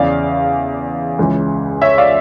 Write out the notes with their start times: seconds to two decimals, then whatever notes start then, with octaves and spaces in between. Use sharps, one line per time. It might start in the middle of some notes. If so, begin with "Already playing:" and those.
Already playing: E2 C#3 E3 D5 F5
1.19 C#2 C#3 E3
1.82 C#5 E5
1.98 D5 F5